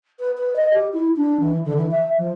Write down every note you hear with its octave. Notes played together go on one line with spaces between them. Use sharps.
B4
B4
D#5
G4
E4
D4
E3
D3
E3
E5
F3